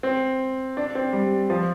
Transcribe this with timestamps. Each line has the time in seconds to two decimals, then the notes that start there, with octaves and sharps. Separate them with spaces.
0.03 C4
0.77 D4
0.95 C4
1.13 G3
1.50 F3